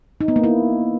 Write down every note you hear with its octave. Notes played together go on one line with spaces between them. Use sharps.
D#4
B3
A#3
E4